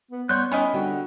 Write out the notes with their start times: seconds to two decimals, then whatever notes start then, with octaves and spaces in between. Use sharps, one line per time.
0.11 B3
0.29 G3 B3 C#5 C6 F#6 G6
0.52 D#3 C#4 E4 D#5 G#5 B5
0.73 D3 G3 F#4 G5